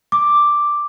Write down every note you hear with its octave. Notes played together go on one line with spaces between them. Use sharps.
D6